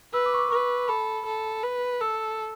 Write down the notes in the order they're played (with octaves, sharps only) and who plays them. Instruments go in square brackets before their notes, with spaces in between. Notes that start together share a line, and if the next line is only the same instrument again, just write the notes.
[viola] B4 [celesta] E6
[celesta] D6
C#6
D6
[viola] B4 [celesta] C#6
[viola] A4 [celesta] B5
[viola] A4
B4
[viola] A4 [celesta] E6